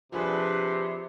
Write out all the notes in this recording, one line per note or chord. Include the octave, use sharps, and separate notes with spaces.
C3 F3 D4 G#4 B4 C6